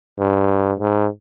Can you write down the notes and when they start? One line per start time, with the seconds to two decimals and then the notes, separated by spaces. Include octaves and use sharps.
0.19 G2
0.80 G#2